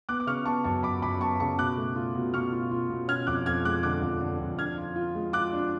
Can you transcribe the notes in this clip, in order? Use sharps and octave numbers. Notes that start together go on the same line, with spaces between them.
B3 D6 F#6
D6
C#3 C#6 F6
B3 A5 C#6
F#2 A5 C#6
F#2 B5 D6
F#2 B5 D6
B3 A5 C#6
C#3 A5 C#6
B2 D6 F#6
A3
F4
B2
B2 C#6 F6
F4
F4
B2
C#4 F6 G#6
F2 D6 F#6
F2 F6 G#6
G#3 D6 F#6
D3 D6 F#6
F2
D3
F2
D4 F6 G#6
F4
F4
G#3
F4 D6 F#6
D4